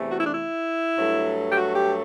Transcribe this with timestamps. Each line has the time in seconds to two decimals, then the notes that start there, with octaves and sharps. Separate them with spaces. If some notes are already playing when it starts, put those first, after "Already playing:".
Already playing: E2 C3 E3 A3
0.10 F#4
0.18 E4
0.26 D4
0.34 E4
0.98 G2 F#3 A3
1.51 G4
1.56 F#4
1.75 G4